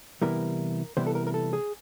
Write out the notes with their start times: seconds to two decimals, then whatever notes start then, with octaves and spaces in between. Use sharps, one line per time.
0.22 C3 E3 G3 B3 E4 A#4
0.97 C3 E3 G3 B3 E4 C5
1.07 A4
1.15 A#4
1.27 A#4
1.34 A4
1.53 G#4